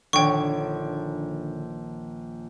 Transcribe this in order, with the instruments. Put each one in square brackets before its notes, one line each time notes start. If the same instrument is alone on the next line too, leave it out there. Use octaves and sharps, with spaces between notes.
[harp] A#1 D#3 C#5 [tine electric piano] D3 D4 [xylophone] G5 C#6